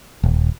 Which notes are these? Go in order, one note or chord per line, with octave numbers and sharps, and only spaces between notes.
D#1